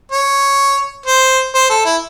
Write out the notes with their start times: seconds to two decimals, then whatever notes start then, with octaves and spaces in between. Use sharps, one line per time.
0.12 C#5
1.06 C5
1.55 C5
1.70 A4
1.85 E4